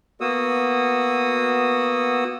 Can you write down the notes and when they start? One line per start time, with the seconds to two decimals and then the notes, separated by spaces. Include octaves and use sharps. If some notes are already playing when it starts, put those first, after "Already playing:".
0.21 A#3 B3 F#4 D#6 E6